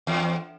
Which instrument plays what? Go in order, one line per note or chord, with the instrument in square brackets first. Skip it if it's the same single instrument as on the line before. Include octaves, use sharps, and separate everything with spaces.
[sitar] E2